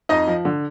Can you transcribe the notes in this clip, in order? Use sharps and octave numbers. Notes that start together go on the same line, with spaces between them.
F2 D#4 D#5
F3
D3